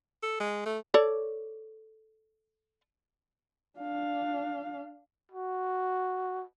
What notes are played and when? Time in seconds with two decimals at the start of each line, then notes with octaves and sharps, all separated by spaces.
0.23 A4
0.40 G#3
0.65 A3
0.94 A4 C#5 D5
3.78 D4 F5
5.32 F#4